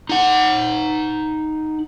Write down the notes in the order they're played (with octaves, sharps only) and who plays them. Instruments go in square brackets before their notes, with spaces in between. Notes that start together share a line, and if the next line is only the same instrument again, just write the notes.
[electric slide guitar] D#4 F#5